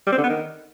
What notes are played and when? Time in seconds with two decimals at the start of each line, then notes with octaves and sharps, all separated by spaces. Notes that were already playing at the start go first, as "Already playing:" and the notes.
0.06 G3
0.12 C4
0.18 D3
0.23 B3
0.29 D#3